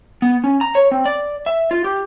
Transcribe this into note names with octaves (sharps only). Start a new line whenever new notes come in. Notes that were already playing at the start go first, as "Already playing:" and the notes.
B3
C#4
A#5
C#5
C4
D5
E5
F4
G4